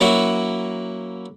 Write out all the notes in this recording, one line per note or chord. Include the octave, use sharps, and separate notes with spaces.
F#3 A#3 C#4 E4 F#4